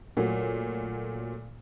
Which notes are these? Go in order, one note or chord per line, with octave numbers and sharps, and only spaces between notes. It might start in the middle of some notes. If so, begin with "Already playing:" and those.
A#2 F#3 A3